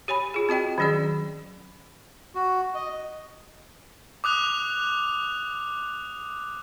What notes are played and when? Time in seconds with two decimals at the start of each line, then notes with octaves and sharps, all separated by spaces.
0.08 G4 C#5 G#5 B5
0.34 F4 G#4
0.49 C4 F#4 D#5 G5
0.78 D#3 F#3 C#4 G#4 D5
2.35 F#4
2.75 D#5
4.24 D6 D#6 F#6 F7